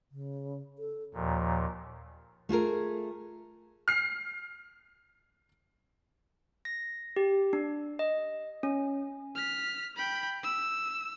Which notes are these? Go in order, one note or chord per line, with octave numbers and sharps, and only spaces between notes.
C#3
A4
D#2 A#2 F3
A3 F4 G#4 A#4
F6 C7
A#6
G4
D4
D#5
C#4
F6 B6
G5 B5
E6